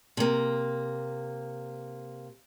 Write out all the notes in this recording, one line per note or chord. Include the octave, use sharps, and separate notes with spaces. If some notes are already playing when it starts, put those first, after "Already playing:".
C3 A#3